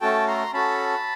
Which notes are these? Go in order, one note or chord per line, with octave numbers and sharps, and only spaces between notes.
A3 C#4 F#4 A4 G5 A5
A#5 C6
C#4 F#4 A4 A5 B5